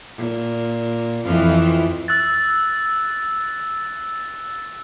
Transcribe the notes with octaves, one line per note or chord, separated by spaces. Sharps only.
A#2
F2 E3 F3 C4 F4
E6 F#6 A6